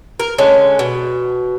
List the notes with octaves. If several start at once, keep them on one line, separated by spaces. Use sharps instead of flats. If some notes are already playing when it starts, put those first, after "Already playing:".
A#4
D3 G#3 C#4
B2